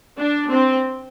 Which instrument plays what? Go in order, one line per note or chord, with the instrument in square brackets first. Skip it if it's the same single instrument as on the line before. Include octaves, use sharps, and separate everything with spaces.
[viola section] D4
C4